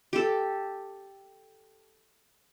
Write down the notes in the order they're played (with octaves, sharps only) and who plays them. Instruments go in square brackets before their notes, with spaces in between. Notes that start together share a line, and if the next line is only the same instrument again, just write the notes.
[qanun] G4 A4